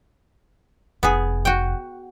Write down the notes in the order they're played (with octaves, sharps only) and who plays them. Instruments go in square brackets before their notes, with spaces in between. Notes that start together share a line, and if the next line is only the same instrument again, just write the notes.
[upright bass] F1 [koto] B3 G#4
[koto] F#4 G5